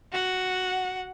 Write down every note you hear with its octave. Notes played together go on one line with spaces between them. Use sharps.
F#4 F#5